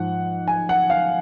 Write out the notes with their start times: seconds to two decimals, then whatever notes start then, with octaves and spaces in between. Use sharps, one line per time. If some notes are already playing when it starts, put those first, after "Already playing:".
Already playing: G#2 F3 F#5
0.48 G#5
0.69 F#5
0.90 F5